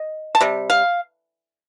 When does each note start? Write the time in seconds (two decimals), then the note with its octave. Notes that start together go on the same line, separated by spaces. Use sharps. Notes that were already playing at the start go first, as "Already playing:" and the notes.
Already playing: D#5
0.35 A5
0.41 C3 G3
0.70 F5